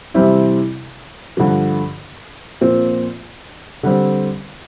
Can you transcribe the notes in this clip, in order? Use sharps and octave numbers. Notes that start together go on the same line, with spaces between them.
C3 E3 G3 C4 E4
G2 D3 F3
A#2 F3 C4
D3 G3 C4